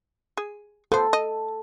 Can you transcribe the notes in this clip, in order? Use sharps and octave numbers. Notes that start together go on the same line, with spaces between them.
G#4
F3 B3 A4 C5
D#5